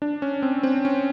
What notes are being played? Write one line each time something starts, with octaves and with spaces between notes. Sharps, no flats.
D4
C#4
C4
C4
C#4